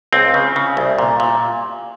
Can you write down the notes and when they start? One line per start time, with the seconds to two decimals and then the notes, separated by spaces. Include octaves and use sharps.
0.13 C#2 C4
0.34 C#3
0.56 C#3
0.77 C2
0.99 A#2
1.20 A#2